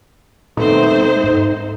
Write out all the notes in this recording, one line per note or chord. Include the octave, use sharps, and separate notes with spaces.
B2 D#3 A3 B3 C4 D#4 A4 C5
G#3 A#3
G#2